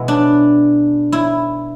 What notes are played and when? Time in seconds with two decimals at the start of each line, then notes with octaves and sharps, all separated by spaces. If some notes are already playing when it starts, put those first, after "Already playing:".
Already playing: B2 G#3 B3 E4
0.08 D4
1.12 E4